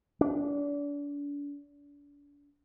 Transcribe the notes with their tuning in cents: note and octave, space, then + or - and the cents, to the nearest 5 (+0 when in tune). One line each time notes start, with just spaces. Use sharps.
D4 -35